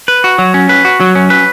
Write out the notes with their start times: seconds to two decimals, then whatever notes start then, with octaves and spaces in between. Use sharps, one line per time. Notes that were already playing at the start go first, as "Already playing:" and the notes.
0.08 B4
0.24 F#4
0.38 F#3
0.54 C#4
0.69 B4
0.85 F#4
1.00 F#3
1.15 C#4
1.30 B4